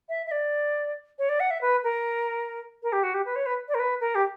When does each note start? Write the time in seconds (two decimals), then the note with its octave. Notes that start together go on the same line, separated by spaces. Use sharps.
0.09 E5
0.26 E5
0.31 D5
1.19 C#5
1.29 D5
1.40 F#5
1.51 E5
1.61 B4
1.84 A#4
2.83 A#4
2.93 G4
3.03 F#4
3.14 G4
3.25 B4
3.36 C#5
3.46 B4
3.68 D5
3.75 A#4
3.80 B4
4.00 A#4
4.15 G4